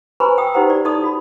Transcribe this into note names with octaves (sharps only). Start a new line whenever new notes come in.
B4 C5 G#5 A#5 B5 C#6
G5 D#6 E6
D#4 G4 B4 C5 F#5 A#5
G4 D5
D#4 A4 D5 A5 C6 D#6
F#4 B5